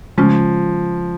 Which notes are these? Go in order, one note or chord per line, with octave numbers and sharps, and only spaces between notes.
C#3 F3 G#3 C#4 F4